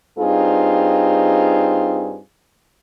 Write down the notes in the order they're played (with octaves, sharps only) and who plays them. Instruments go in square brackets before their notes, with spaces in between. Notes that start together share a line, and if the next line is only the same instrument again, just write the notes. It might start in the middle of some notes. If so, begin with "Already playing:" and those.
[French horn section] G2 C4 D#4 F4 G#4